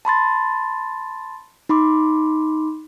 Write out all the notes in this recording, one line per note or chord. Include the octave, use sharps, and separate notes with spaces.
A5 B5 C6 A6
D#4 B5 C6 D6